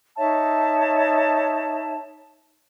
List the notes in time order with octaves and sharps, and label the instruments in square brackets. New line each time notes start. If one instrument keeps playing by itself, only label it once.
[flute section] D#4 C#5 E5 A5